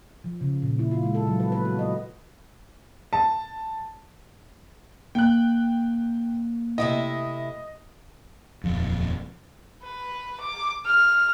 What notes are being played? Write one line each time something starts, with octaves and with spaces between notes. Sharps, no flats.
F3
C#3
A#2
E4
F4
G#3
A4
F#3
B4
B4
F#4
D#5
A5
A#3 G5 F#6
C3 A3 E4 D#5
D#1 F2
B4
D6
F6